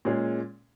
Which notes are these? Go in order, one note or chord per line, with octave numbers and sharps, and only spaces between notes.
A#2 G#3 C#4 G#4